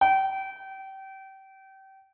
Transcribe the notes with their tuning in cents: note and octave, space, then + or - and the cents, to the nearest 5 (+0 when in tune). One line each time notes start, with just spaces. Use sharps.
G5 -30